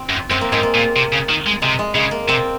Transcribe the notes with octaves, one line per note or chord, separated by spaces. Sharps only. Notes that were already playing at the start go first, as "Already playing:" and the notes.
Already playing: C4
F#2
F#2 C4
A#3
G#2 G#3
A#3
A#2
C3
C#3
D#3
G#3
C3 G#3
G#3
C#3 G#3
A#3
C3 C4